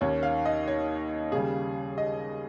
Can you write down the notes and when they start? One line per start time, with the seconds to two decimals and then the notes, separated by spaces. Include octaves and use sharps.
0.01 D#2 D#3 A#3 C#4 C#5
0.23 F5
0.46 D#5
0.68 C#5
1.32 D#2 C#3 G3 G#4
1.98 D#5